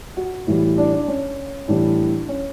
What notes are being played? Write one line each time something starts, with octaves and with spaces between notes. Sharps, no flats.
F#4
A2 E3 G3
D4
D4
C#4
A2 E3 G3 D4
C#4